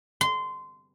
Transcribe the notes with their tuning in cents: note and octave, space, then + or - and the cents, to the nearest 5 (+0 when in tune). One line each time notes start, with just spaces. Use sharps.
C6 -20